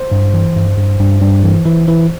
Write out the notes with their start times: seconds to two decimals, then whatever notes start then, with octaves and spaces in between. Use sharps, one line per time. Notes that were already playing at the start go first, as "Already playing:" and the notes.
Already playing: C5
0.12 G2
0.34 E3
0.56 G2
0.78 G2
1.00 G2
1.21 G2
1.44 E3
1.65 E3
1.88 E3